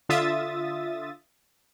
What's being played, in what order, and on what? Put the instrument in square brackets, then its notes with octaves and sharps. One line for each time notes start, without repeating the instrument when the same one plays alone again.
[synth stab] D3 F4 E5 D#6 A6